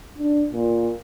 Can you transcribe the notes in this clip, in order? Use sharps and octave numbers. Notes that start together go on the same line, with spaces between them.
D4
A#2